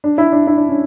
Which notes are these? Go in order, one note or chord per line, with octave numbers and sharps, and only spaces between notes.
D4
E4
D4
E4
D4
C#4